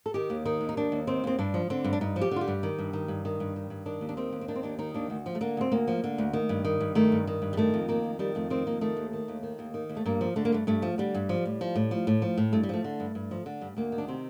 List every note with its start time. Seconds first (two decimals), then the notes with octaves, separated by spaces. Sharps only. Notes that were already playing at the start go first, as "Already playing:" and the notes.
0.06 A4
0.14 D#3 G4
0.30 D#2
0.46 D#3 D#4
0.61 D#2
0.69 D#4
0.77 D#3 D4
0.92 D#2
1.07 D#3 C4
1.24 D#2 C4
1.39 G2 D4
1.54 F3
1.70 D3 C4
1.84 G2
1.93 D4
2.01 G2 D#4
2.16 F3
2.21 G4
2.31 D3 F4
2.41 G4
2.48 G2
2.63 D#3
2.79 G2
2.93 D#3
3.08 G2
3.25 D#3
3.40 G2
3.56 D#3
3.70 G2
3.86 D#3 D4
4.01 D#2
4.09 D4
4.17 D#3 C4
4.32 D#2
4.41 C4
4.48 D#3 D4
4.55 C4
4.63 D#2 D4
4.79 D#3 D#4
4.94 D#2 D4
5.10 D2
5.26 F3
5.35 A3
5.41 D3 A#3
5.57 D2 C4
5.72 D2 A#3
5.88 F3
6.04 D3
6.18 D2
6.33 D#3
6.49 G2
6.65 D#3
6.80 G2
6.95 D#3 A3
7.12 G2
7.27 D#3
7.42 G2
7.53 G3
7.57 D#3 A3
7.74 F2
7.89 D#3 A#3
8.04 F2
8.19 D#3 G3
8.35 F2 A3
8.50 D#3 C4
8.67 F2 A#3
8.81 D#3 A3
8.97 D#2
9.13 D#3
9.28 D#2
9.43 D#3
9.59 D#2
9.74 D#3
9.89 D#2
9.96 A3
10.06 G2 A#3
10.21 F3
10.36 D3 A3
10.45 A#3
10.52 G2 A3
10.67 G2 A3
10.82 F3
10.98 D3 G3
11.14 G2
11.29 F3
11.45 A2
11.61 F3
11.76 A2
11.91 F3
12.07 A2
12.22 F3
12.37 A2
12.53 G2 A3
12.63 G3
12.69 F3 A3
12.84 D3
13.00 G2
13.15 G2
13.31 F3
13.46 D3
13.61 G2
13.77 D2 A#3
13.92 D#3
13.98 D4
14.08 C3 C4